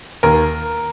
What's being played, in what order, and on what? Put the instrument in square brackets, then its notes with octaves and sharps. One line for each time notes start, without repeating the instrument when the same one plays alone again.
[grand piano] D#2 A#4